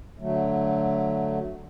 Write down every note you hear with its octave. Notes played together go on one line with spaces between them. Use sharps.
D3 F#3 A3